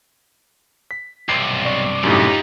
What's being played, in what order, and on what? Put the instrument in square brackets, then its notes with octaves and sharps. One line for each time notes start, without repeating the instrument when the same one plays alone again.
[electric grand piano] B6
[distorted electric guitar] B1 [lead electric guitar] G2 C3 [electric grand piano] C7 D7 D#7
[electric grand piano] D5 C#6
[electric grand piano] F#2 A2 [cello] D#4 G4 [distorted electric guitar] F4 D5